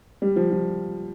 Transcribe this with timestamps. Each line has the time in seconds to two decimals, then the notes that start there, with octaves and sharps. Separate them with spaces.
0.22 G3
0.36 F3
0.51 F3